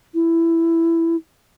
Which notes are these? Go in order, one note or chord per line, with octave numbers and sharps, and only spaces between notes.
E4